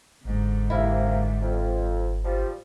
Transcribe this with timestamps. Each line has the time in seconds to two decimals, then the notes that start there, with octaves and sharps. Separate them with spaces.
0.25 G1 G#2 D3
0.70 G1 C3 A#3 E4
1.41 F2
2.24 F3 G3